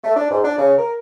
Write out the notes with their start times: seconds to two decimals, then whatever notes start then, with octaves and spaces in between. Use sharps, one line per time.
0.04 A3
0.17 D4
0.31 G#2
0.44 D4
0.58 C#3
0.79 A#4